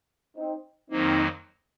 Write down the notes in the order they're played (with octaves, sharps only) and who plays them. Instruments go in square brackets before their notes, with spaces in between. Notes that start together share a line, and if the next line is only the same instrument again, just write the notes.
[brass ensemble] C4 D#4
[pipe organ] F2 D#3 F#3 A#3 [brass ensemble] C4 D#4